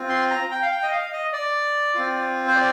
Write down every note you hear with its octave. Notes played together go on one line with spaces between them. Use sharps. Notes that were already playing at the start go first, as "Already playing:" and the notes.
Already playing: C4 F4
C6
A#5
G5
F5
G5
D#5
F5
D#5
D5
C4 F4
C5
D5